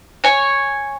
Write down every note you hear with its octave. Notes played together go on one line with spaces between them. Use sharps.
C#5 G#5